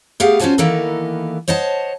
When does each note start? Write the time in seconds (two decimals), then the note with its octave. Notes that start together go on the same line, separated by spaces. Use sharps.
0.20 A3 B3 G4 G#4 F5 F#5
0.40 C#4 F4 F#4 C5 G#5 A5
0.58 D#3 E3 A#3 B3 A4 A#4
1.48 C5 C#5 D#5 F#5 A5